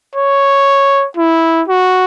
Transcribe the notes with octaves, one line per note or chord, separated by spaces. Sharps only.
C#5
E4
F#4